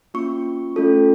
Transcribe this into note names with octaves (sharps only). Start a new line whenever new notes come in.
A#3 C#4 F4 C#6
A3 C#4 F4 A4